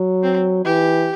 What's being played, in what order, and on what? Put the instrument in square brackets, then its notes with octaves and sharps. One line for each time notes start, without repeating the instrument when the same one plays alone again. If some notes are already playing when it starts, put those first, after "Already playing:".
Already playing: [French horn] F#3
[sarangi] C4
[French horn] E3 [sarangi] G4